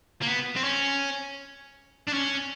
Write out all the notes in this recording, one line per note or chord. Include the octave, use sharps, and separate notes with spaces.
A#3
B3
C4
C#4
D4
C#4